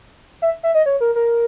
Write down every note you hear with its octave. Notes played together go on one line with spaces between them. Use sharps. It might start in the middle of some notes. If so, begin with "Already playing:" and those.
E5
E5
D#5
C#5
A#4
A#4